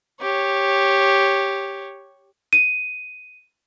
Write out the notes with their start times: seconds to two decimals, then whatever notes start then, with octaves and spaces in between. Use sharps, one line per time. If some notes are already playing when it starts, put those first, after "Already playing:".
0.22 G4 C#5
2.53 D#7